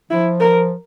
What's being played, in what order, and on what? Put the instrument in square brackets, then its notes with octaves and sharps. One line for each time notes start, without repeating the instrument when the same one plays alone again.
[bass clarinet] F3 [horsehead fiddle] E4
[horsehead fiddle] A#4